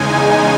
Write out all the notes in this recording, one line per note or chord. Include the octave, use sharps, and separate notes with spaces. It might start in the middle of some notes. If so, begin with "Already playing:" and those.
Already playing: E2 C#3 G#3 D#4 G#5